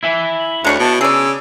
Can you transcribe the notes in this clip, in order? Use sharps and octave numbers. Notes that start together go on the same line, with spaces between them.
E4 E5 G#5
F#7
D2 G#3 D4 C#5 C#7
B2 A5
C#3 G#4 D5 E6